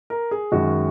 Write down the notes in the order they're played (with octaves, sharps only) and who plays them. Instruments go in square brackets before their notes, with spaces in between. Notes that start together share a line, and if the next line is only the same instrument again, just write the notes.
[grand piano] A#4
G#4
F#2 D#3 G#3 F#4